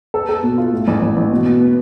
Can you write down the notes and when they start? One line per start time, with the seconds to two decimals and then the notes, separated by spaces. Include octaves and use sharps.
0.14 A4
0.29 A4
0.43 B2
0.58 F4
0.72 A2
0.88 A1
1.02 A1
1.17 A1
1.32 B2
1.46 B2
1.60 B3